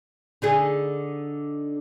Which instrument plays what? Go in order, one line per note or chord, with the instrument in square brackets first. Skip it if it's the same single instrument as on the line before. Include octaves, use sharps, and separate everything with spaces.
[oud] D3 D#4 G#4